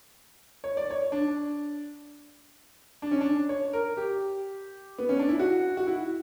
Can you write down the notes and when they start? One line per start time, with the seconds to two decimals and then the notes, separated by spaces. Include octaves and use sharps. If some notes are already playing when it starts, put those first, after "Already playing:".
0.64 C#5
0.77 D5
0.91 C#5
1.12 D4
3.02 D4
3.11 C#4
3.21 D4
3.49 C#5
3.73 A#4
3.97 G4
4.98 B3
5.09 C#4
5.19 D4
5.29 E4
5.39 F#4
5.77 F#4
5.87 E4